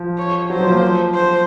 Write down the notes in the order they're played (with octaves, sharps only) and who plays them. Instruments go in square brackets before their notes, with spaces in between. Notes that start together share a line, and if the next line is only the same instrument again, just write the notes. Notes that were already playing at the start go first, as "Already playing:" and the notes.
Already playing: [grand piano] F3
[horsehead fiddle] C#5
[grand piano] F#3 [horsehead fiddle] C5
[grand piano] F3
A#3
F3
[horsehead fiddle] C5